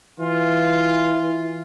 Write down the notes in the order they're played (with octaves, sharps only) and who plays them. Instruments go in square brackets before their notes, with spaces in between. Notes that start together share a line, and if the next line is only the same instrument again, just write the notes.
[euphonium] E3 [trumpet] F4